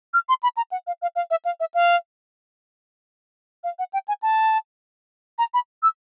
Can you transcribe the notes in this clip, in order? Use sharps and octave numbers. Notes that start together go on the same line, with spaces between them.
F6
C6
B5
A#5
F#5
F5
F5
F5
E5
F5
E5
F5
F5
F#5
G5
G#5
A5
A#5
B5
E6